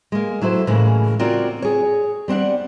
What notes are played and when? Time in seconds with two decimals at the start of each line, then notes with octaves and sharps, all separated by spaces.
0.12 G#3 A#3
0.41 F#3 E4 A4 C5
0.67 A2 C#3 E3 G#3 A#3
1.20 C4 F4 F#4 A#4 C#5 D5
1.62 G#4 C#5
2.28 G3 C4 D4 F#5